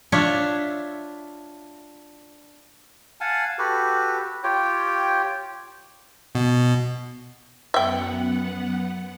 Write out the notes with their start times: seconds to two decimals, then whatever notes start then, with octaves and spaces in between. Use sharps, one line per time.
0.12 D4 F4 C#5 E5
3.21 F5 F#5 G#5 A5
3.59 F#4 G4 A4 B4
4.44 F4 G4 C#5 G5
6.35 B2
7.74 F#2 B3 E5 F#5 G5